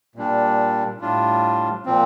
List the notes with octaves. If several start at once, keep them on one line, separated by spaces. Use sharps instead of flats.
A#2 G3 D4
A2 G3 D4 F4
A#2 F3 C4